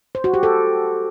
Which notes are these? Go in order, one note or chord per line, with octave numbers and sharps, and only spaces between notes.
C5
F#4
G4
A4